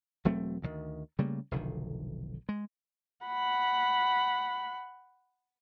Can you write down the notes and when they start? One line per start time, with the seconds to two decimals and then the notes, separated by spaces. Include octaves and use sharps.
0.25 E1 F#3 A3 C4
0.62 D2 D3 D#3
1.19 C#3 G3 A3 A#3
1.51 F1 B1 D3 D#3
2.49 G#3
3.26 F#5 B5